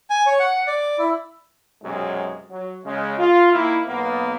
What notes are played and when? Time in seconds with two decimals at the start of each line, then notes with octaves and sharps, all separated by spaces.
0.10 G#5
0.26 C#5
0.40 F#5
0.67 D5
0.98 E4
1.83 B1 F#2 C3 F#3 G#3
2.50 F#3
2.85 C#3 G#3
3.18 F4
3.53 D#3 A#3 E4
3.87 B1 A#3 B3